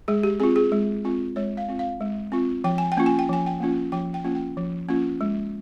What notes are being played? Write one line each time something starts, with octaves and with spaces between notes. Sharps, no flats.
G#3 G#4
G4
C4 F4 G#4
G#4
G#3
C4 F4
G#3 C#5
F5
C4 F4
F5
G#3
C4 F4
F3 G5
G#5
G5
A#3 C#4 F4
G#5
G5
F3 G#5
G5
A#3 C#4 F4
F3 G5
G5
A#3 C#4 F4
G5
F3
A#3 C#4 F4
G#3